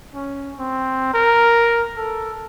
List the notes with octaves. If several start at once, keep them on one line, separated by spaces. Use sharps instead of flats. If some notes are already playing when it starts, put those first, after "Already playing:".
C#4
C4
A#4
A4